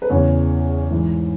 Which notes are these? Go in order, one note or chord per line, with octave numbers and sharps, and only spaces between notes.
B4
E2 C#3 E3 C#5
G#2 E3